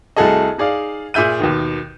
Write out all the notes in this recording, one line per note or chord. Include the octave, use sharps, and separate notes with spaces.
C2 A3 F#4 G#4 A4 D#5
D#4 G#4 D5 F5
A#2 G#4 E5 G6 D#7
D#2 B2 D#3